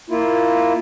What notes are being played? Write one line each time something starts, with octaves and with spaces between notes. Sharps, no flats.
A#3 E4 F4